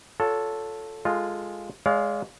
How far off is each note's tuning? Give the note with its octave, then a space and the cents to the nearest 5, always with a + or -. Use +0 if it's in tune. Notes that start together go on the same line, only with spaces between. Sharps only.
F4 +35 A4 +0 C#5 +30
G#3 -5 F4 +0 A4 +0
G#3 +0 D5 -40 F5 +0